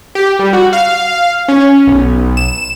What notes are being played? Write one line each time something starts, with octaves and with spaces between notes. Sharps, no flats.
G4
G3
F#4
F5
C#4
B1
E7